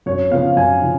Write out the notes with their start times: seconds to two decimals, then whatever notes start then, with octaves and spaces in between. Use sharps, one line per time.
0.06 F#2 C#5
0.31 C#3 F3 B3 F5
0.56 F#2 G#5
0.81 C#3 F3